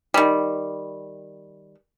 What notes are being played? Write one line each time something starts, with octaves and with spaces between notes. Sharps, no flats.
D#3 G3